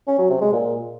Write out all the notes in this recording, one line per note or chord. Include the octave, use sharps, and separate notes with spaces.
C#4
F#3
C3
G#3
A#2